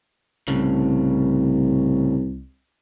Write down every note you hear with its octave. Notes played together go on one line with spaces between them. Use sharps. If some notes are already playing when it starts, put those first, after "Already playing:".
C2 A2 C#3